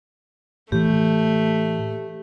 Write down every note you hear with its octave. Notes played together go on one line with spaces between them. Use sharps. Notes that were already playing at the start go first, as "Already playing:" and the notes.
A2 E3 A3 G4